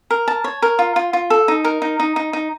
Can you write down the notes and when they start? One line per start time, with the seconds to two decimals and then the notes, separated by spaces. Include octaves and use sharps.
0.11 A#4
0.28 A5
0.44 C#5
0.62 A#4
0.79 F4
0.96 F4
1.13 F4
1.30 A4
1.48 D#4
1.65 A#4
1.82 D#4
2.00 D#4
2.16 D#4
2.33 D#4